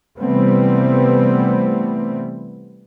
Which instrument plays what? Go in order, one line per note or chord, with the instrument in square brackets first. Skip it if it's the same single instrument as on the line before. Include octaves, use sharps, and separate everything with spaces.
[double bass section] C3 E3 G3 A3 B3 C4